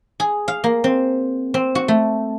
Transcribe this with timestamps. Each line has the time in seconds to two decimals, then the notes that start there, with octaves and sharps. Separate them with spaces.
0.20 G#4
0.48 F5
0.64 A#3
0.84 C4
1.54 C4
1.75 F#4
1.88 A3